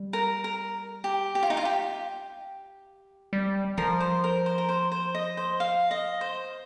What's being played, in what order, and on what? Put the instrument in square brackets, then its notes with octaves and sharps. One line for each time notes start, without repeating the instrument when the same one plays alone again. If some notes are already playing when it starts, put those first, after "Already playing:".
Already playing: [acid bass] G3
[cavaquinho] A#4
A#4
G4
G4
F4
D#4
F4
G4
[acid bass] G3
[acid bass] F3 [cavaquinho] A#4
[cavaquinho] C5
A#4
C5
A#4
C5
C5
D#5
C5
F5
D#5
C5